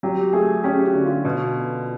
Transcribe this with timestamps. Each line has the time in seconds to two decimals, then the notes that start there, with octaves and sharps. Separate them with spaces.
0.03 F#3 G4
0.33 A3 G#4
0.63 C#4 G4
0.85 F#4
0.94 D3
1.05 F4
1.25 B2